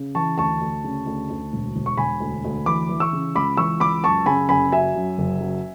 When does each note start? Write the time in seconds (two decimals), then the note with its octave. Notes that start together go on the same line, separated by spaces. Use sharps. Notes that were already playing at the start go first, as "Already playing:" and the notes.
Already playing: C#3
0.15 E3 A5 C#6
0.38 D2 A5 C#6
0.61 D2
0.84 C#3
1.06 D2
1.30 D2
1.53 E1
1.76 E1
1.86 C#6
1.98 E1 G#5 B5
2.20 D2
2.44 D2
2.66 E3 B5 D6
2.89 E3
3.00 C#6 E6
3.13 C#3
3.36 C#2 B5 D6
3.57 E3 C#6 E6
3.80 C#2 B5 D6
4.04 F#2 A5 C#6
4.26 C#3 G#5 B5
4.49 F#1 G#5 B5
4.72 F#3 E5 G#5
4.96 F#2
5.18 F#1
5.40 F#3